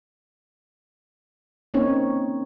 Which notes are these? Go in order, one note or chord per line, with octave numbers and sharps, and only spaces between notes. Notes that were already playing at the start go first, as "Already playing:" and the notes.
A#3 C4 C#4 D#4 C#5